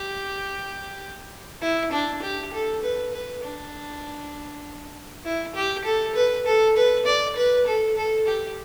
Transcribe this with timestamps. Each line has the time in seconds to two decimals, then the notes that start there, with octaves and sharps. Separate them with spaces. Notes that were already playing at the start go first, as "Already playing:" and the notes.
Already playing: G4
1.62 E4
1.92 D4
2.22 G4
2.53 A4
2.83 B4
3.13 B4
3.44 D4
5.25 E4
5.55 G4
5.85 A4
6.15 B4
6.46 A4
6.76 B4
7.06 D5
7.37 B4
7.67 A4
7.97 A4
8.27 G4